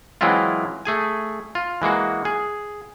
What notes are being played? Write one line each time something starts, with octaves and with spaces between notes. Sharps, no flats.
E3 F#3 G#3 C4 E4 F4
A3 G#4 G#5
F4
E3 G#3 A#3 F#4
G#4